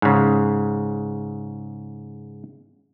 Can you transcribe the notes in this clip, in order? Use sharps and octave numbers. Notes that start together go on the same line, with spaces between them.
G#2 C#3